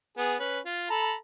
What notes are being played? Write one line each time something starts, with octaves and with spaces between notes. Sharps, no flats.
B3 G#4
C#4 B4
F4
A4 A#5 B5